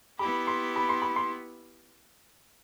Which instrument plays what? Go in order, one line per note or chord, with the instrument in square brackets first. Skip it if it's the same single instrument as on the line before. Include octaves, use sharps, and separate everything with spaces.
[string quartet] B3 E4 G4 [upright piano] B5
[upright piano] C6
B5
C6
B5
C6